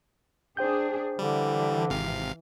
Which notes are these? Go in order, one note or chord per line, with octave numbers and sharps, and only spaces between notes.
D4 G#4 C5 G5 G6
D3 E3 G3
G#1 C3 F5